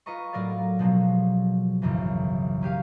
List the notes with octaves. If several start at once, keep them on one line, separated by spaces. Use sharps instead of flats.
F4 B4 D#5 A#5 C#6
A2 F#3 A#4 D5 F5 A6
B2 F3 F#3 G#3
G#1 C#2 F#2 C#3 E3
A#3 C#4 G4 F5